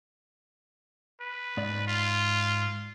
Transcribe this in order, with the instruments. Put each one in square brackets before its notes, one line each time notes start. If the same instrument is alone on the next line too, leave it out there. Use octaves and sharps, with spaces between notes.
[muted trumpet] B4
[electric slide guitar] G#2 D5
[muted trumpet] F4